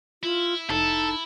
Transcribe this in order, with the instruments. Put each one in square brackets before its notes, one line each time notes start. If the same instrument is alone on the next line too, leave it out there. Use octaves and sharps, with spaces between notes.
[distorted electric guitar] E4 [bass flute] F4
[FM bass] F1 [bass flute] D#4 [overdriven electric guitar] A4